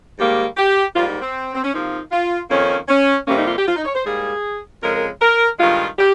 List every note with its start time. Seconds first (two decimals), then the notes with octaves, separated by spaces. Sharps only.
0.18 G#2 D#3 G3 A#3 G4
0.57 G4
0.95 G#2 G3 A#3 F4
1.08 D#4
1.21 C4
1.55 C4
1.63 C#4
1.73 C3 F3 A#3 D#4
2.11 F4
2.49 F2 D#3 A#3 C#4
2.89 C#4
3.27 F2 C3 G3 A#3 C#4
3.37 D#4
3.46 F4
3.57 G4
3.66 F4
3.76 D#4
3.85 C#5
3.95 C5
4.04 G#2 G3 A#3 G#4
4.82 F2 C#3 G#3 A#4
4.95 A#4
5.20 A#4
5.59 G2 D#3 G#3 F4
5.98 G4